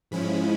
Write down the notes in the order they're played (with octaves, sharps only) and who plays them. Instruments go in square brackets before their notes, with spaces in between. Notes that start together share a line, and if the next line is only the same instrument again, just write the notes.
[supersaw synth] G#2 F3 G#3 C#4 E4 B5